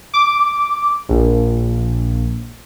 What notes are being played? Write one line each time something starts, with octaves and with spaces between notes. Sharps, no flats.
D6
A#1